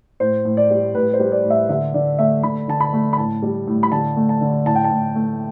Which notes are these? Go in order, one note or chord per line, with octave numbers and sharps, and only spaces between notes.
A2 C5
A2
D5
G3
A2 B4
C5
G3
D5
A2
E5
D3 E5
D3 D5
A3 E5
D3 B5
D3 A5
B5
A3
B5
A2 A5
G3
A2
B5
D3 A5
A3
A5
D3
A2 A5
G5
A5
A2
A3